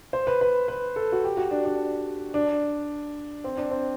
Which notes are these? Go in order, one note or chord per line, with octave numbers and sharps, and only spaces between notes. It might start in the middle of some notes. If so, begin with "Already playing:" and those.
C5
B4
B4
B4
A4
F#4
G4
F#4
D4
D4
D4
C4
D4
C4